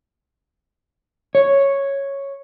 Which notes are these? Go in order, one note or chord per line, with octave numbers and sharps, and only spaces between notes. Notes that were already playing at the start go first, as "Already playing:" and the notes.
C#5